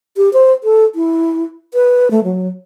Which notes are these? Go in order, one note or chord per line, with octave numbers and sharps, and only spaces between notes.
G4
C5
A4
E4
B4
A3
F#3